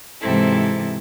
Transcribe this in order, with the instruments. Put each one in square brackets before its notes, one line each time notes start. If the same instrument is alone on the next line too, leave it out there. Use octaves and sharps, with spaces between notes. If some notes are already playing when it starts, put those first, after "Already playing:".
[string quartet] G#2 C3 E3 C4 E4 A4